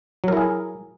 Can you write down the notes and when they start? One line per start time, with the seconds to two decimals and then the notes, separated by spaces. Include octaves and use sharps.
0.24 F#3
0.28 A#4
0.33 E4
0.37 G#4